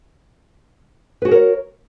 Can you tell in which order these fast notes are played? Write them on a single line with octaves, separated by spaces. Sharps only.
B4 F#4 G#4 A#4 C#5